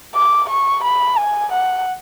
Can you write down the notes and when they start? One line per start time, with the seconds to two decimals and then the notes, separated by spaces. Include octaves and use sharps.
0.15 D6
0.49 C#6
0.84 B5
1.18 G#5
1.52 F#5